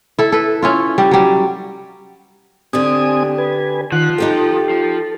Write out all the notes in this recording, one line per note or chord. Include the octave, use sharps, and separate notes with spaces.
E4 A4
A4 B4
C#4 E4 F4
G3
F#3 G3
D3 C4 D4 G4 G#5 D#6
B4 G#5
D#3 F3 F#5 F#6
D#4 G4 A4 G5
F3